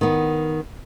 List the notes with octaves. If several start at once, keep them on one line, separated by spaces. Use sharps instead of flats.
D#3 B3